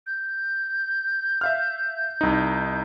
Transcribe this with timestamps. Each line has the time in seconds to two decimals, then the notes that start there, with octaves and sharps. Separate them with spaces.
0.07 G6
1.41 E5 F5 F6
2.21 C2 D#4